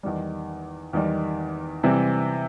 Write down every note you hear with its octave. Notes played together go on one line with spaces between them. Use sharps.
E2 D#3 G3
E2 D#3 G3
C3 E3 G3 C4